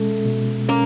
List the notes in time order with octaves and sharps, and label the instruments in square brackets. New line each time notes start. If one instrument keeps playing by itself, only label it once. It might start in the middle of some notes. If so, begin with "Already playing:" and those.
Already playing: [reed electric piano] B2 G#3 C#4 [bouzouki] A3
[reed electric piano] B2
[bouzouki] A#3 [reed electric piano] C#4